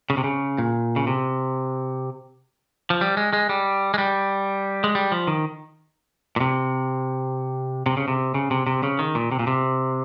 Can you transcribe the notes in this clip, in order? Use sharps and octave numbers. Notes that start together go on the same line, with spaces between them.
C#3
C3
C#3
A#2
C#3
C3
F3
G3
G#3
G#3
G3
G#3
G3
G#3
G3
F3
D#3
A#2
C3
C3
C#3
C3
C#3
C3
C3
C#3
D#3
A#2
C3
A#2
C3